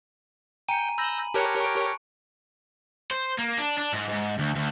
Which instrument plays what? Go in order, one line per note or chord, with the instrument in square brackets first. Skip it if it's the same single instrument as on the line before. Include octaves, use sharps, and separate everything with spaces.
[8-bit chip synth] G5 C#7 [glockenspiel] G#5 A#5 D#7
[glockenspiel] B5 F#7 [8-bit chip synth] E6 G6 A#6
[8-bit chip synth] G4 A#4 C#5 [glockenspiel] A5 F#6 C#7
[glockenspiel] C#6 D7
[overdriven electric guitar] C5
A#3
D4
D4
G#2
G#2
D2
D2